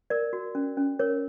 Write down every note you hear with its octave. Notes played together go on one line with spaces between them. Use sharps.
A#4 D5
F#4
C#4
C#4
A#4 C#5